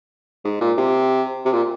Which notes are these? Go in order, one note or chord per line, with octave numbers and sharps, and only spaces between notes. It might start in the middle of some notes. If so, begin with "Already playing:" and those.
G#2
A#2
C3
C3
A#2